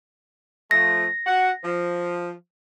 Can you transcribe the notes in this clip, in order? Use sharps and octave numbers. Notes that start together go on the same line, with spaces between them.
F3 A3 A#6
F#4 F#5
F3